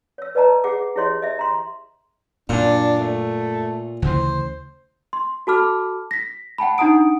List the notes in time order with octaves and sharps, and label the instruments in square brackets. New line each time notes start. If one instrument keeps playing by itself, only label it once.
[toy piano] C#5 E6
B4 D5 D#5 A5 A#5
G#4 F#5 D6
E4 G4 G#4 C#5 D#5 C6
D#5 E5
A#5 C6
[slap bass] F#2 [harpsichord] A#2 [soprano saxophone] D4
[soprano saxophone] A3
[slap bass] D2 C#3 E3 [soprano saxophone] C5
[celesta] C6
F#4 A4 A5 B5 D6 F6
A#6 B6
F#5 G5 A5 B5
D4 D#4 F#5 A#5 D#6 D7